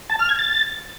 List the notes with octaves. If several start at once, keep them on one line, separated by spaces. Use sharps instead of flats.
A5
F6
G#6
A6